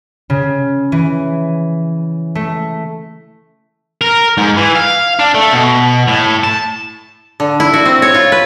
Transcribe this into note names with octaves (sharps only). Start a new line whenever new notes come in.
C#3
E3
A3
A#4
G#2
E3
F5
D4
A3
B2
A2
A5
D3
E4
F#4
C4
C#5
F4
B4